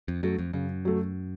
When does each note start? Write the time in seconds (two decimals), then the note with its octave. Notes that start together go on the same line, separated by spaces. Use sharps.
0.08 F2
0.23 F#2 F#3 A3
0.39 F2
0.53 F#2 C#3
0.85 F#3 A3